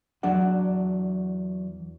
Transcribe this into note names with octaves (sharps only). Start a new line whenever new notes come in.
E2 F#3 D4 D5 F#5